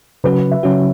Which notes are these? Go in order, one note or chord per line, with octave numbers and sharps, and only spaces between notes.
C#3 F#3 C#4 F#4 B4
E5
C#3 F#3 C#4 F#4 C#5